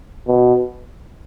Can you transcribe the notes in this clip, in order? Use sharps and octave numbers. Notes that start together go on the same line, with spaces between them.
B2